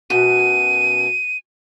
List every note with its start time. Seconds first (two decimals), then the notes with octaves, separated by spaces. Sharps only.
0.10 F#2 B2 D#7